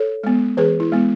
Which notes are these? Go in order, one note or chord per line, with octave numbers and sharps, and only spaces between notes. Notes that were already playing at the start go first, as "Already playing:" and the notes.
Already playing: A4 C#5
G#3 B3
E3 G#4 B4
E4
G#3 B3